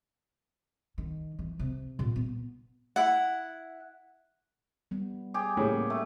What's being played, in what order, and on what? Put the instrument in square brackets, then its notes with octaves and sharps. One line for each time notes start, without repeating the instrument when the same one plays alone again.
[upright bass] D#3
E3
C3
A#2
B3
[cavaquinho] E4 F#5
[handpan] G3 B3
[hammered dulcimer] G4 G#4 D5
[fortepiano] A2 C#3 G3 [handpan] A#3 B3
[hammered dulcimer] A3